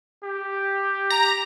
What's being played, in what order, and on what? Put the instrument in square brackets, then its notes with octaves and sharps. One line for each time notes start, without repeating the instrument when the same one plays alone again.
[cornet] G4
[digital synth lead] A#5